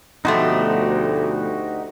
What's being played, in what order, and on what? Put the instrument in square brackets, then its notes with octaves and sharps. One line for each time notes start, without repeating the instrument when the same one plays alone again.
[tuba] D2 [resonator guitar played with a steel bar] B2 F3 A3 [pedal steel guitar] D#4 F#4 G4